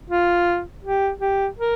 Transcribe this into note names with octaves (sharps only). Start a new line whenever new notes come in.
F4
G4
G4
A#4